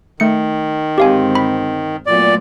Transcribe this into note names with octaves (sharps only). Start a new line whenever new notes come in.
D#3 A3 C#7
G1 G#3 C4 G4 F5 G#5
B5
A#2 F#3 A3 B3 D5